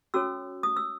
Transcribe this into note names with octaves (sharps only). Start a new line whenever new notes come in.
C#4 F#4 A4 C#5 E6
D#6
E6